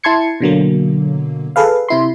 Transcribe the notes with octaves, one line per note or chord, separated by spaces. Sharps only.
E4 A5 C6 G#6 C#7
B2 D3 F#3 A#3
G#4 A4 B4 F5
C3 E4 C6